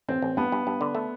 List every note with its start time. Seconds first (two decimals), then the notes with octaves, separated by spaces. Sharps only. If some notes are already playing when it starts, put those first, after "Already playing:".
0.09 A1 C4
0.22 A1
0.37 G2 B3
0.52 G2
0.67 G2
0.81 D3
0.95 A3